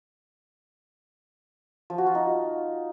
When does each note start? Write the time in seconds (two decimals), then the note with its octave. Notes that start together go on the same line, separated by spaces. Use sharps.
1.90 F3
1.98 F#4
2.07 F4
2.15 D#4